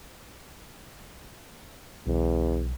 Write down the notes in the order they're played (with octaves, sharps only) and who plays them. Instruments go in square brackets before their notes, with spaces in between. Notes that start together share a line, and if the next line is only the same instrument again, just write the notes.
[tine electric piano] B1 [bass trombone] E2